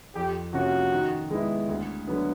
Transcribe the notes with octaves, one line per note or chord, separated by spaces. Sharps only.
F2 G4
C3 F3 A#3 C#4 F#4
D#3
G#3 B3 E4
D2
D3 F#3 B3